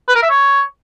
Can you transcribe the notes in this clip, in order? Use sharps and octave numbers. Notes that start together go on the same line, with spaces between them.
B4
A#4
E5
C#5